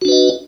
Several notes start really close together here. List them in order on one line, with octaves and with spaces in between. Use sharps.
F#4 D4 B4 D#5